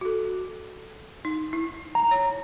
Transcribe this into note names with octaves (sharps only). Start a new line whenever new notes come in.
F#4 A4
D#4
E4
A#5
C#5